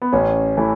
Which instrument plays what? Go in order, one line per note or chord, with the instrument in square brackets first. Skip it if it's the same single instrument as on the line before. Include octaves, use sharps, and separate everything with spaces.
[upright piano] B3
[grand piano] A1 [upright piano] C#4
[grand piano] E3 A3 E4